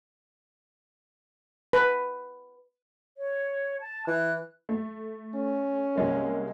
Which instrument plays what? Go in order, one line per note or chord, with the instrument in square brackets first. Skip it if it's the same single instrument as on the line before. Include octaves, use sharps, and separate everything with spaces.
[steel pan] B4
[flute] C#5
A5
[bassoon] E3 [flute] F#6
[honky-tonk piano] A3
[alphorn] C#4
[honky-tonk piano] C2 G#3 A#3